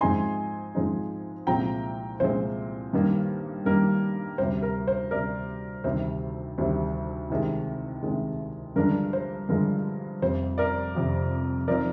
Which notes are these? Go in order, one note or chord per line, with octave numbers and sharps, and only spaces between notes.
G#2 F3 G#3 C4 D#4 G#5 C6
G#2 F3 G#3 C4 D#4
C2 A#2 F3 G#3 C4 G5 A#5
C2 A#2 F3 G#3 C4 C5
G2 D#3 G3 A#3
G2 D#3 G3 A#3 A#4
D2 C3 G3 C5
A#4
C5
D2 C3 G3 A#4 D5
D2 C3 D#3 G3 C4 C5
D2 C3 D#3 G3 C4
C2 C3 D#3 G#3
C2 C3 D#3 G#3
G2 D3 F3 G#3 D4 A#4
C5
G2 D3 F3 G#3 D4 A#4
F1 F2 C3 C5
A#4 D5
F1 F2 C3
F3 C4 D#4 A#4 D5